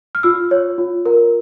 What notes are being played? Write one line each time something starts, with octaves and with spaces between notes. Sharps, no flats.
F6
F4 E6
C#5
F4
A#4